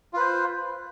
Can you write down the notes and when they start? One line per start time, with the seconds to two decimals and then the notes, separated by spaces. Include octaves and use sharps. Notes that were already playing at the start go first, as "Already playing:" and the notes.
0.13 F4
0.17 B4
0.20 C5